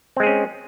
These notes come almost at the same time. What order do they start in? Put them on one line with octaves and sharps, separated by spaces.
C4 G#3 G#4 C#4